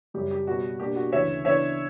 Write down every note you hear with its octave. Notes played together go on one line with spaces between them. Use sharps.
F#2 C#3 G3 G4
G4
B2 G3 B3 F#4
B2 A#3 D4 G4
F#4
D2 C#3 E3 C#5 E5
C#3 E3 B3 D4 C#5 E5